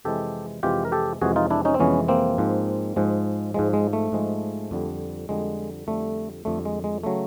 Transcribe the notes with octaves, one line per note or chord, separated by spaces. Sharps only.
F2 C3 E3 G#3 G4 A4
F2 C3 E3 G#3 F4 G4
A#4
G4 A4
F2 C3 E3 G#3 F#4 G#4
D#4 F4
D4 E4
C#4 D#4
C4
F2 C3 E3 G#3 B3 C#4
A#3 C4
G#2 F3 G#3
G#2 F3 G#3
G#2 F3 G#3
G#3
A3
G#2 F3 G#3
F2 D3 G3
F2 D3 G3 G#3
F2 D3 G3 A3
F2 D3 G3 A3
G#3
G#3
C#3 F#3 A3